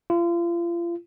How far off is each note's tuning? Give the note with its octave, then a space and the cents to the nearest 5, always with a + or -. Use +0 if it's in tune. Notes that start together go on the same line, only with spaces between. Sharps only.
F4 -35